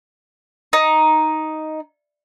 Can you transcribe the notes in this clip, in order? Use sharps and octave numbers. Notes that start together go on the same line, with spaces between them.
D#4